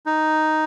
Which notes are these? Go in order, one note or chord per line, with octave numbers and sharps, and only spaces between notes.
D#4